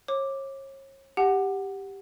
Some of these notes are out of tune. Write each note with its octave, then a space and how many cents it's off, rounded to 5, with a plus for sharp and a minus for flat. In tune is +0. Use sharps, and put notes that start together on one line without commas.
C#5 -35 D6 +0
G4 +0 F#5 +0 A5 -40